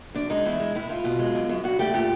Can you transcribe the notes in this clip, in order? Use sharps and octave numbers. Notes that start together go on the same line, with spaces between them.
F#2 D4
G#3 D#4
E2 E4
G#3
A2 E4
A2 F4
B2
G#3
F#2
F#2
G2 F#4
A3 G4
A#2 G4